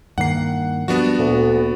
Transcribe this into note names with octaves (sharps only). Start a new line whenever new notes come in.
G2 D#3 A#3 F#5 C7
F3 G3 B3 D4 F#4
D2 A#2